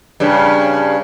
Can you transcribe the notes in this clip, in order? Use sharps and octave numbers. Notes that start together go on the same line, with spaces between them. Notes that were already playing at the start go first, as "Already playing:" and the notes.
G2 C#3